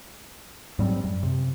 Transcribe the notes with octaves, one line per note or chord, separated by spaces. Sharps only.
G#2 F#3 G3 C4
F#2
C3